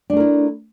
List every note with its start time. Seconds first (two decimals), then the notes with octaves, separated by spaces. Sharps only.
0.10 D4
0.13 A3
0.17 A#4
0.20 E4